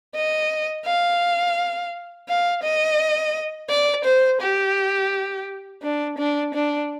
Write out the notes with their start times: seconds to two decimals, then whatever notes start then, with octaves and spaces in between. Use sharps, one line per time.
0.15 D#5
0.86 F5
2.29 F5
2.63 D#5
3.69 D5
4.05 C5
4.42 G4
5.82 D4
6.18 D4
6.54 D4